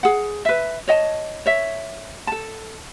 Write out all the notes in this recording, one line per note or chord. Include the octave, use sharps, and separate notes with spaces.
G#4 F#5
B4 E5
C#5 D#5 F#5 A5
C#5 E5
A4 A5